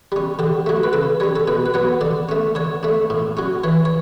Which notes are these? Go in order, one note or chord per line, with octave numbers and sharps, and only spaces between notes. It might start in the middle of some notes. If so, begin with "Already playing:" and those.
G3 C#4
D3 G4
F#3 A3
B4
C#3 A4
G3 C#4 C#5
A4
B2 B4
B4
F#3 B3 C#5
D3 D5
A3 C#4
D3 C#5
A3 D4
A2
F#3 C#4
E3 C#5
C#5